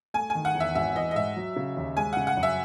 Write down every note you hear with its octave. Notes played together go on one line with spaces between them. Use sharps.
A3 G#5
G#5
D#3
F#5
E2
E5
G#1 E5
E3 D#5
D#5
G#2 E5
F#3
C#3
D#2
G#3 G#5
C#3 F#5
F#5
F#2
E5